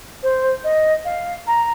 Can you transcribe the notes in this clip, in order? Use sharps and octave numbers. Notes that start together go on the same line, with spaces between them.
C5
D#5
F5
A#5